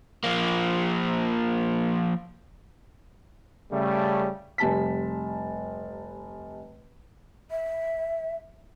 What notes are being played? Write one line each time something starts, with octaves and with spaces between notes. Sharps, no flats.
F3 A#3
C#3 G3 A3
F1 G3 A5 B6
E5